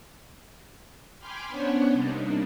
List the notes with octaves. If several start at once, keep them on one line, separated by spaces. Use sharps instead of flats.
G5 G#5 B5 C6 D6 F6
B3 C#4 D4 C5 C#5 F#5
C3 G3 A#3 D4 D#4